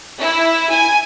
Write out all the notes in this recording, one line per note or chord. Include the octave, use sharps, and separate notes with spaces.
E4
G#5